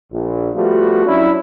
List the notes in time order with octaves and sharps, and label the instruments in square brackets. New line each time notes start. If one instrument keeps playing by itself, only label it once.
[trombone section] A#1
F3 G3 A3 B3 F4 F#4
F#3 C#4 D4 E4